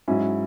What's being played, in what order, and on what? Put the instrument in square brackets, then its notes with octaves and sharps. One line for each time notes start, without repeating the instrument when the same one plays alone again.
[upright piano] G#2 F#3 C#4 E4